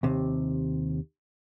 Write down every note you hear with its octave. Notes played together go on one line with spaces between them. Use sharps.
D#2 C3